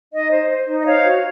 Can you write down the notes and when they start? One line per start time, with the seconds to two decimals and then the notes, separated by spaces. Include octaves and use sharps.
0.12 D#4 D#5
0.30 C5
0.50 C5
0.67 D#4
0.80 D#5
0.85 C5 C#5 F5
1.04 F#4